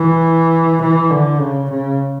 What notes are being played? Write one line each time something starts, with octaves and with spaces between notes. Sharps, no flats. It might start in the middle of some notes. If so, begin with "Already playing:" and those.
Already playing: E3
E3
D3
C#3
C#3